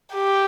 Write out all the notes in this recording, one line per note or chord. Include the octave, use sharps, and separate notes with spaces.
G4